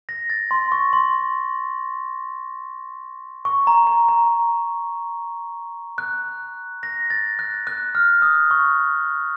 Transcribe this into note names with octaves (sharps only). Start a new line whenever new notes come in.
A#6
A6
C6
C#6
C6
C#6
A#5
A#5
A#5
F#6
A#6
A6
F#6
F#6
F6
D#6
C#6